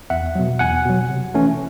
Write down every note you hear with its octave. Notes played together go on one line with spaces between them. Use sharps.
E2 E5 F#5
B2 F#3
E2 F#5 G#5
B2 F#3
C3
E3 A3 C#4